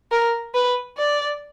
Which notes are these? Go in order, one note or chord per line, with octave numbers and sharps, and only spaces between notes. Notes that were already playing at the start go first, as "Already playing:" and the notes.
A#4
B4
D5